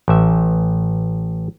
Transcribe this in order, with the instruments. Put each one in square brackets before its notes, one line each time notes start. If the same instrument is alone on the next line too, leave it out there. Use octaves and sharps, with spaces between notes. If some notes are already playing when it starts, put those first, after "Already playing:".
[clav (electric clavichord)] A1 E5